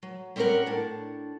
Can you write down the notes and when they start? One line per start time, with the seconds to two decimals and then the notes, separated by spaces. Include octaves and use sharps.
0.03 F#3
0.36 G3 C4 C#4 G4 A#4 F#5
0.66 A2 D4